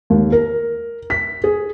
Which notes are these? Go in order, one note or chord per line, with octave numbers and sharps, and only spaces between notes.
D#2
A#4
B6
G#4